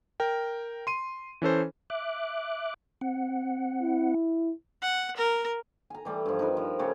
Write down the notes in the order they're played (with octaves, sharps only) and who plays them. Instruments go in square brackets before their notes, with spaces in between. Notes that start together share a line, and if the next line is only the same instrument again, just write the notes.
[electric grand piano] A#4 G5
C6 D#7
E3 C#4 A4 C5
[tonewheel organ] E5 D6 F#6
C4 F#5
[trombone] E4
[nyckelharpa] F#5
A#4
[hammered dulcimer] G#5 A#5
E3 G3 A3
G2 F3
D#4 A#4 B4
F3
C#3 A3 G4 C#5